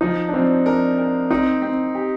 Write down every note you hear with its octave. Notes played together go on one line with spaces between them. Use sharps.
F3 D#4
D4
F3 C4
D4 A#4
A#4
C4 D#4
C4
G4